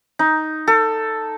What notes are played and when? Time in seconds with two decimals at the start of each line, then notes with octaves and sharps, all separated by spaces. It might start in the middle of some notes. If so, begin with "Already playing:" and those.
0.19 D#4
0.68 A4